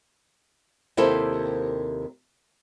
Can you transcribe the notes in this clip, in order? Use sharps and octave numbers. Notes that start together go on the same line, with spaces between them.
D#2 C3 A#3 E4 A4 C5